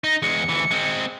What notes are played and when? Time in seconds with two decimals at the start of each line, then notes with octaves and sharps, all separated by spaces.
0.04 D#4 A#6
0.22 E2 G#3 C#7
0.49 D2 E3
0.71 G#3 C4